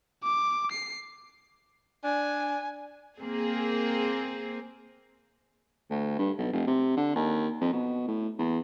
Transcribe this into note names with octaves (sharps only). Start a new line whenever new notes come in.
D6
C7
D4 G#5
A#3 C4 G#4
D2
G2
B1
F1
C3
D3
D#2
F2
B2
A2
E2